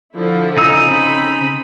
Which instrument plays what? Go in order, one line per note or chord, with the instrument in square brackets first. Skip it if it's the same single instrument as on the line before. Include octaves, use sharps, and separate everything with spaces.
[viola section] D3 F3 E4
[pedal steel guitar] C#3 D#4 E6
[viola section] C4 B5